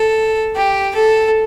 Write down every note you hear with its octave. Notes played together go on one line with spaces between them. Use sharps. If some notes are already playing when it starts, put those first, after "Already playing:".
Already playing: A4
G4
A4